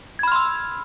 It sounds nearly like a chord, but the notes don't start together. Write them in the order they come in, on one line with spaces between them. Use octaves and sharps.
G#6 B5 F6 C6 E6